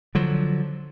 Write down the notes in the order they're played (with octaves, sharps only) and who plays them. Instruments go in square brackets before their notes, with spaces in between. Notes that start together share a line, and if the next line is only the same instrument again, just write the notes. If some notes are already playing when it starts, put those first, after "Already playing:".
[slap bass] D3 F3 F#3